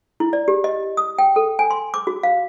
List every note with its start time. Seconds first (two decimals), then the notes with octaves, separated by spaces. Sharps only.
0.20 E4
0.33 D5
0.48 G4
0.64 D#5
0.97 D#6
1.18 G5
1.36 A4
1.59 G#5
1.71 C6
1.94 D6
2.07 F#4
2.23 F5